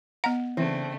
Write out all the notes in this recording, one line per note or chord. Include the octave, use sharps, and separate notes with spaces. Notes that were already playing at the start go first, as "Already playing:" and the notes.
B3 D#5 F#5 A#5
C#3 E3 A3 C4 D4